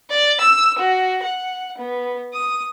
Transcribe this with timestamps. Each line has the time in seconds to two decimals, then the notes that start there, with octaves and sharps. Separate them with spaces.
0.10 D5
0.40 E6
0.78 F#4
1.23 F#5
1.78 B3
2.33 D#6